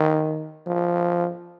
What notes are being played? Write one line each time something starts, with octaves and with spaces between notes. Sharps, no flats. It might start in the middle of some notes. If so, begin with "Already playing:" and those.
Already playing: D#3
F3